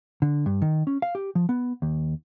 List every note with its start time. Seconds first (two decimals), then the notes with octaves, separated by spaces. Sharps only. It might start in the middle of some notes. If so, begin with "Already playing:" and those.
0.22 D3
0.46 G2
0.62 D#3
0.87 C#4
1.02 F5
1.15 G4
1.35 F3
1.49 B3
1.82 D#2